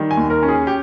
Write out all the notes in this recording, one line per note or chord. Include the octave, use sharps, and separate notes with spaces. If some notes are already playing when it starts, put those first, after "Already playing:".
Already playing: D#3 G3
G#5
D#2
A#4
C#4
G#4
G4